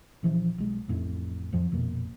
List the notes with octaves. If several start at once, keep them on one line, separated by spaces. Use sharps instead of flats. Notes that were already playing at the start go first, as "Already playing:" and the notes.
A#1 E3 F3
B1 G#3
A1 F2 A2
F2 F3
A#1 F2 B2 A#3